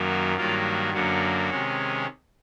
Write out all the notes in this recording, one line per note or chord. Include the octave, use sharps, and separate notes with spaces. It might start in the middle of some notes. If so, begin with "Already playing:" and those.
Already playing: F#2 D#3 F#3 A#3
F#4
G2 D#3 F#3 A#3 F4
F#2 D3 F#3 A#3 F#4
C3 D#3 G#3 C#4